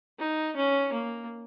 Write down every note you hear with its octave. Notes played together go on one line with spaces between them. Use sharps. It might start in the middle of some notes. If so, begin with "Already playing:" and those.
D#4
C#4
A#3